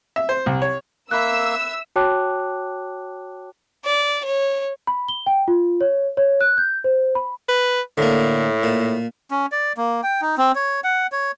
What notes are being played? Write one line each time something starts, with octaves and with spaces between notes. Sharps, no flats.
E5
C5
C2
C#5
A#3 E5 B5 E6 F#6
F#4 C#5 G5 A5 D6 F#6
D5
C#5
B5
G7
G5
F4
C#5
C#5
F#6
G6
C5
B5
B4
A2 D3 A#3
A#2
C#4
D5
A#3
G5
D#4
C4
C#5
F#5
C#5